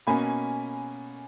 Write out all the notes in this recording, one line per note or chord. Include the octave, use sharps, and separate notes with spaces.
B2 A#3 C#4 G#5 B5